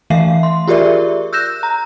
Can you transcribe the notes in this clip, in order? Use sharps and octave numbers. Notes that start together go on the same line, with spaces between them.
E3 A3 E5 F5 C7
C6
F4 G4 G#4 A#4 D5 E5
E6 F#6 G6 A#6 E7
A#5